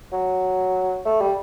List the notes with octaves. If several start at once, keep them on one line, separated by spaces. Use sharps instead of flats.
F#3
A3
G3